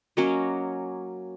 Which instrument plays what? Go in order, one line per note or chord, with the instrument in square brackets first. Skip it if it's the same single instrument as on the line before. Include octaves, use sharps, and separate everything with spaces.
[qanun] F#3 A#3 C#4 D#5